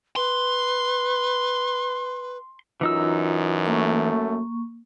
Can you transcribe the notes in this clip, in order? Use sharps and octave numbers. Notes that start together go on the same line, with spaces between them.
B4 C6
F#2 E3 D#4 F4 E6
A3 A#3 C#6